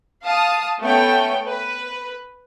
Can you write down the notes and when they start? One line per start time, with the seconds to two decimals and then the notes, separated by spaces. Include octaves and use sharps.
0.23 F5 A5 D#6
0.80 A3 B3 C#4 G5
1.46 B4